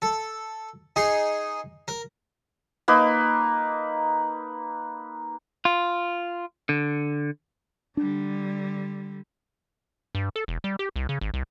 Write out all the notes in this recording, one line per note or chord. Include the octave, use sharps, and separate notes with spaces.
A4
D#4 G#4 C6
A#4
A#3 D#4 B4
F4
D3
D3 G3 D4
G2
A4
E1
G3
G4
C2
C#3
G#1
C2